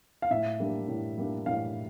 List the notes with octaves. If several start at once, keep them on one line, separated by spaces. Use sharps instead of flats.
F5
A2 E5
G3 A#3 D4
A2
G3 A#3 D4
A2 F5